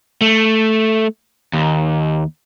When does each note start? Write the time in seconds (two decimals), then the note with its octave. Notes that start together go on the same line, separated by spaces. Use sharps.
0.21 A3
1.53 D#2